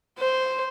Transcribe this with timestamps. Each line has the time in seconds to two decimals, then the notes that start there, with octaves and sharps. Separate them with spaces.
0.19 C5